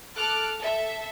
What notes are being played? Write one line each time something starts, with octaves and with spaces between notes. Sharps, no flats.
A4 D6 F6 F#6
A4 E5